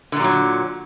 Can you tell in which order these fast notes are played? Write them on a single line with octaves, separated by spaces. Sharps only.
D3 A#2 G3 F#3